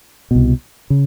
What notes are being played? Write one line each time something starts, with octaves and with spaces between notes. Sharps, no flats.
C2 B2
C#3